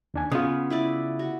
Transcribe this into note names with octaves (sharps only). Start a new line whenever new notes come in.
D#2 D4 G#5
C#3 B3 F4 D#6
E4 B4 D5
F#4